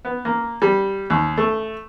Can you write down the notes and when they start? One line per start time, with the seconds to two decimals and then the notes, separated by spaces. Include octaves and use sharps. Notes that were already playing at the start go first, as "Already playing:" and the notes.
0.05 B3
0.25 A#3
0.62 G3
1.10 D#2
1.38 A3